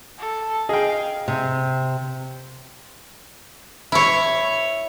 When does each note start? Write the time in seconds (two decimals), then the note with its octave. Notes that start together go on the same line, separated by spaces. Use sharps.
0.19 A4
0.69 G#4 D#5 F5 G5
1.28 C3
3.92 E4 C#5